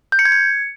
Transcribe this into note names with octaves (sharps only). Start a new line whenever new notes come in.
G6
C#7
G#6
C#7